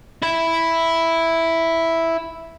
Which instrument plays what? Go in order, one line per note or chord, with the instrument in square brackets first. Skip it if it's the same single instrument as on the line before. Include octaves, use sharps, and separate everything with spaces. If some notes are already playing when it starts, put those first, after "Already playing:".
[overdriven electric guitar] E4 E5